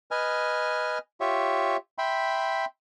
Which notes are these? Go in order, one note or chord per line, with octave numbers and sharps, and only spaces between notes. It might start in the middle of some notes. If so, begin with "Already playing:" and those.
B4 D#5 G#5 F6
F4 G4 C#5 E5
E5 G5 B5 C6